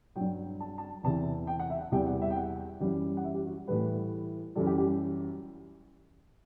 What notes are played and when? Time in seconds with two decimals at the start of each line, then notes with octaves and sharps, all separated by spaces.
0.16 G2 F#3 G5
0.60 A5
0.78 A5
1.03 E2 C3 E3 A5
1.47 G5
1.59 F#5
1.70 E5
1.81 F#5
1.91 E2 C3 E3 G3 G5
2.06 F#5
2.22 E5
2.30 G5
2.36 F#5
2.80 F#2 E3 G3
3.17 F#5
3.24 E5
3.34 G4
3.46 F#4
3.68 A2 E3 G3 B4
4.56 F#2 E3 G3 A4
4.67 G4
4.78 G4